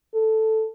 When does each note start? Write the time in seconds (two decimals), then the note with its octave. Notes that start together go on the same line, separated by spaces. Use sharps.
0.14 A4